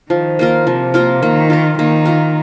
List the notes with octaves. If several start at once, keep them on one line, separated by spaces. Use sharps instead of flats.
D#3 F3
A#3 F4 A#4
C3 F3
A#3 F4 A#4
D#3 A#3
F4 A#4
D#3 A#3
F4 A#4